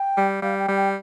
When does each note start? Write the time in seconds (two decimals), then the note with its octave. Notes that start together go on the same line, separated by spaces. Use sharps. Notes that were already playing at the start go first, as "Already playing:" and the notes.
Already playing: G5
0.17 G3
0.42 G3 F5
0.59 G5
0.68 G3
0.77 G5